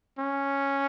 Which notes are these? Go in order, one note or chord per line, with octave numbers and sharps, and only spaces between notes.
C#4